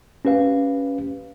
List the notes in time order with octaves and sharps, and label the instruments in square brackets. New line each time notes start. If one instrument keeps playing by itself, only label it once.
[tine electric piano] C#4 G4 B4 F5